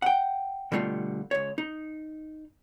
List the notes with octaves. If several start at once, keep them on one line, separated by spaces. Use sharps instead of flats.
F#5 G5
B2 D3 G3 A3 F4
C#2 C#5
D#4